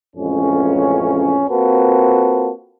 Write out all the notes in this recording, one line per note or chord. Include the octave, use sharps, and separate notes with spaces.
A1 F2 G#3 C#4
A#3 C4 F4 F#4 A4 B4